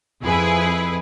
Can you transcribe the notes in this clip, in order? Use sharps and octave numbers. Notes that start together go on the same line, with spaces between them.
F2 E4 G#4 B4